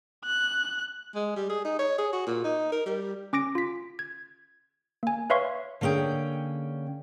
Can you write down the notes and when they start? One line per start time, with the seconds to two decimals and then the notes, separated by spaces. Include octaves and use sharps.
0.25 F#6
1.15 G#3
1.37 G3
1.50 G#4
1.65 D#4
1.79 C#5
1.98 G#4
2.13 F#4
2.27 A#2
2.45 D#4
2.72 A#4
2.86 G3
3.33 C#4 D6 A#6 D7
3.55 F4 B6
3.99 G#6
5.03 A#3 G#5
5.30 B4 C#5 E5 F5 C6 C#6
5.81 D3 A#3 C#4 G#4 G5